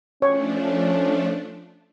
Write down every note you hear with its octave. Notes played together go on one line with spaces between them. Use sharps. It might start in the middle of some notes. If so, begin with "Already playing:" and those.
F3 A3 C#4 D4 C#5